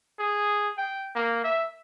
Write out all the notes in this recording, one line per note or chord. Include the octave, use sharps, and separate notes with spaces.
G#4
G5
A#3
E5